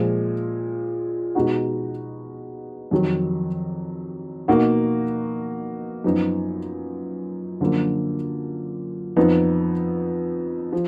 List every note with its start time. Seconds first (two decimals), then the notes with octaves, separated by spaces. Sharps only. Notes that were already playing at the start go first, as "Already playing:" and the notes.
Already playing: A#2 F3 G#3
1.35 B2 G#3 D#4 F#4
2.91 F2 D#3 F#3
4.48 B2 A#3 D#4 F#4
6.04 F#2 F3 B3 D#4
7.60 F#2 D3 F3 A#3 D4
9.17 F2 F3 B3 D#4
10.73 F3